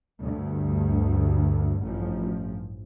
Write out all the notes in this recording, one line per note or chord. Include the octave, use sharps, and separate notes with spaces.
D2 G2
A1 G2 F3